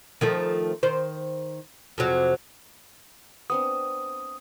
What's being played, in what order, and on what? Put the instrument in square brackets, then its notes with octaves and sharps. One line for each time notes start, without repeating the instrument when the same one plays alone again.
[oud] D#3 F3 A3
D#3 C5
F2 C3 F#3
[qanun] B3 C4 D4 [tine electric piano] D#6